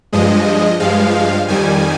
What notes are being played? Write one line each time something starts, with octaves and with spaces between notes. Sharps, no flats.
G2 F3 G#3 D#5
G2 F3 G#3 F5
F2 D#3 G3 G#5